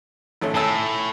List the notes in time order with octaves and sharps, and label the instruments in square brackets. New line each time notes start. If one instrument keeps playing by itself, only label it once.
[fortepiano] G#1 A3 C#4
[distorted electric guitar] A2 [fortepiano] G#5 A5 E6